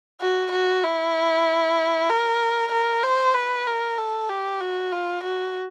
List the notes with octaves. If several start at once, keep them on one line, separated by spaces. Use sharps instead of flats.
F#4
F#4
E4
A#4
A#4
C5
B4
A#4
A4
G4
F#4
F4
F#4